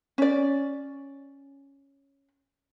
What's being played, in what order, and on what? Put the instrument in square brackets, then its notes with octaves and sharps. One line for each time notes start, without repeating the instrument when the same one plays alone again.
[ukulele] C#4 D5